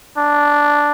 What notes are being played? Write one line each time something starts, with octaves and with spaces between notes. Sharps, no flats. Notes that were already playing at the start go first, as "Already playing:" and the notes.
D4